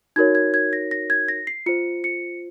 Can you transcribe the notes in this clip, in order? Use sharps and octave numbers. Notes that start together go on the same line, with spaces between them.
D#4 F#4 A#4 C#5 G#6
G#6
G#6
A#6
A#6
G#6
A#6
C7
F4 C5 C#7
C#7